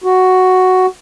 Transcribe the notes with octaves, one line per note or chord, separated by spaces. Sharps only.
F#4